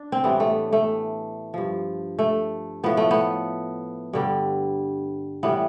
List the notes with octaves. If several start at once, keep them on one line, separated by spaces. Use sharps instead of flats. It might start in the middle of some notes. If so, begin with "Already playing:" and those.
Already playing: D4
C4
A2 E3 G3 B3
A3
A3
G2 F3
A3
A2 F3 B3
A3
B3
G2 D3 G3
A2 E3 G3 B3